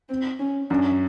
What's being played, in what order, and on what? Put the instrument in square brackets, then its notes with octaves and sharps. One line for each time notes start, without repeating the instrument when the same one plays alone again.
[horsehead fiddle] C4
C#4
[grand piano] F#2 [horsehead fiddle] D4